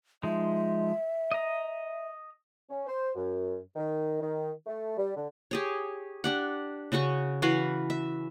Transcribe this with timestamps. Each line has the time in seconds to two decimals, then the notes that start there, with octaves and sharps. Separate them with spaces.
0.23 F3 G#3 D#4 E5
1.32 D#5 A#5
2.70 C#4
2.87 C5
3.15 F#2
3.75 D#3
4.21 D#3
4.66 A3
4.97 G3
5.15 D3
5.51 G4 G#4 C#5
6.24 D4 G4 F#5
6.92 C#3 C#4 F#4 C#6
7.42 E3 F#4 B4 F5
7.90 E5